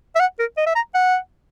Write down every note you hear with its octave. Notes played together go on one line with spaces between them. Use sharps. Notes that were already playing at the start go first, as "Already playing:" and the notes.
E5
F#5
A#4
D#5
E5
A#5
F#5